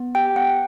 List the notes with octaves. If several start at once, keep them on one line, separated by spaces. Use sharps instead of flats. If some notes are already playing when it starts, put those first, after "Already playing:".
Already playing: B3
G4 G5
B3 F#5